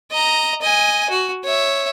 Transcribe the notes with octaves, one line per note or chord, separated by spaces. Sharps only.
D#5 A#5
D#5 G#5
F#4
C#5 E5